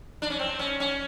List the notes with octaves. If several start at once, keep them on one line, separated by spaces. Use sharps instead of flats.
D4
C#4
C4
C#4
C#4